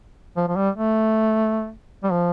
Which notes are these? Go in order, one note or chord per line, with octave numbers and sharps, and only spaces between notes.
F3
F3
G3
A3
G3
F3